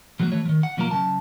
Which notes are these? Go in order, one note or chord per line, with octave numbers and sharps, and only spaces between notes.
F3 F#3 G#3 A#3 F#4
E3 A3 C#5
D#3 F3
F#5
B2 F3 F#3 A#3 F4 A#4
C#3 F#3 A5